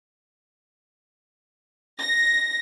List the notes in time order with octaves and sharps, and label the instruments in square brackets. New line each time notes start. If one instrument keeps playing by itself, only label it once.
[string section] A#6